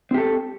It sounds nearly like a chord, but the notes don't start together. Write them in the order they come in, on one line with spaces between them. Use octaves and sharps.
C4 G4 A4